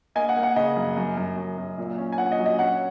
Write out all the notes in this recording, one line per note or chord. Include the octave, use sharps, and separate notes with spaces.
A#3 D#5 G#5
F#5
A#3
F#5
C#3 D#5
F#2
F#2
F#2
F#2
F#2
A#2
C#4
G#5
A#2 F#5
D#5
F#3
D#5
C#4 F#5